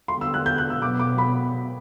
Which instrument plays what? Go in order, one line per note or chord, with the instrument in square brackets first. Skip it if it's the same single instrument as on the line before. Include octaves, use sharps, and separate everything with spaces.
[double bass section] D3 G3 B3 [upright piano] C6
[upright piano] E6
F#6
G6
F#6
E6
[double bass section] B2 F#3 B3 [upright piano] D6
[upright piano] D6
B5